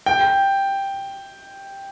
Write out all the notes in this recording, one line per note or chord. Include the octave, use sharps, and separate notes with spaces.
G5